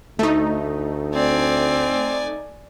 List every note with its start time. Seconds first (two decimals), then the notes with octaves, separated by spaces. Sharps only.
0.19 D2 A3 D#4
1.15 C4 D5 G#5